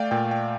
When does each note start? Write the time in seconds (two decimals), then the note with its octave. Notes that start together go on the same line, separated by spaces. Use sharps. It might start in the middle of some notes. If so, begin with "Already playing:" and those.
Already playing: A3 D5 F5 G5
0.11 A#2 G5
0.31 G5